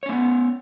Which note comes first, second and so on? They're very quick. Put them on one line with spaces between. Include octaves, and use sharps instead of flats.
C#5 C#4 A#3 B3